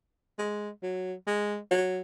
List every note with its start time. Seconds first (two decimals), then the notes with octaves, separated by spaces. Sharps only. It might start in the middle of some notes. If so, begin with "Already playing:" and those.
0.38 G#3
0.82 F#3
1.27 G#3
1.71 F#3